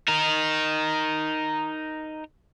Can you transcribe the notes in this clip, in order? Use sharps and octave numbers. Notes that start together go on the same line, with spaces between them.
D#4 A#4